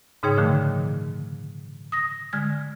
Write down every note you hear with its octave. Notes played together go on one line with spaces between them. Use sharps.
G#2 C#3 D#4 G#4 C#5 G5
A#2 D3 D#3 F3 A3
D#6 A#6
D3 G#3 F6 G#6